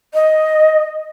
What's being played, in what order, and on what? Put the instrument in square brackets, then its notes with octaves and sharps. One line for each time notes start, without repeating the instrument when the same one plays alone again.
[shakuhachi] D#5